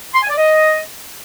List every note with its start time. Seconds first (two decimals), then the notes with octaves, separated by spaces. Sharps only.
0.14 C6
0.22 G#5
0.30 D5
0.38 D#5